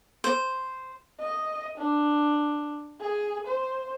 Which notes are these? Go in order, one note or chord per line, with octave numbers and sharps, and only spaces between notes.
C5
D#5
D4
G#4
C5